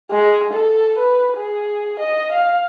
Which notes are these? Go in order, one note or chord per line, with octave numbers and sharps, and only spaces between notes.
G#3
A4
B4
G#4
D#5
F5